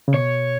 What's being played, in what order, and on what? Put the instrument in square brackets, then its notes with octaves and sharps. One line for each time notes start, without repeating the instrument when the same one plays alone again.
[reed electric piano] C#3
[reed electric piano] B2 [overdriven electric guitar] C#5